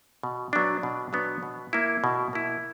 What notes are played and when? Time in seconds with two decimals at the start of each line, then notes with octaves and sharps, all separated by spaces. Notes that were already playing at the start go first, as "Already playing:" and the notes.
0.23 B2
0.53 F#3 B3 D4
0.83 B2
1.13 F#3 B3 D4
1.43 B2
1.73 A#3 E4
2.04 B2
2.33 A#3 E4